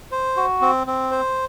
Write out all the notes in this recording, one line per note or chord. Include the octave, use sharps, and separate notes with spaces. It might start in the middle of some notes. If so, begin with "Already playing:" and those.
C5
F#4
C4
C4
C5